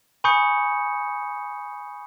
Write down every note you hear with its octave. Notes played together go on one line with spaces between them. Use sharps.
G#5 B5 C#6 D#6 G6 C#7